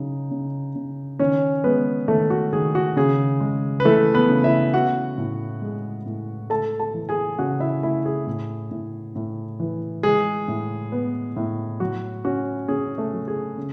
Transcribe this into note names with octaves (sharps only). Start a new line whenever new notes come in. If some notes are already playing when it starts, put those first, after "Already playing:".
Already playing: C#3 F#3 D#4
C#3
C#3
D#3 C#4 C#5
G#3 B3 B4
D#3 A3 A4
F#4
D#3 G#4
F#4
C#3 G#4
G#3
B4
E3 A3 A4
B3 B4
C#3
E4 E5
B3 F#4 F#5
A2
G#3
A2
A3 A4 A5
A4 A5
E3
G#4 G#5
C#3 F#4 F#5
E4 E5
A3 E4 E5
G#4
A2
A2
A2
E3
G#3 G#4
A2
B3
A2
F#3 F#4
C#4 F#4
C#4 G#4
A3 A4
F#3
G#4
C#3